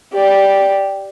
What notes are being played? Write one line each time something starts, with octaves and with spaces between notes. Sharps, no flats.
G4 D5